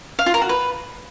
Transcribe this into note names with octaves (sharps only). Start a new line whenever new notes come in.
F5
F4
A#4
F#4
B4